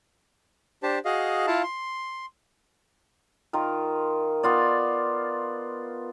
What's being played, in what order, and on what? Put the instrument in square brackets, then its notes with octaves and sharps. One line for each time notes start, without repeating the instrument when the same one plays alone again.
[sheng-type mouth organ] D4 G4 C5 A5
F#4 G#4 D#5 F5
E4 F4 F5 A5
C6
[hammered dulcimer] D#3 F4 A#4
B3 F4 D5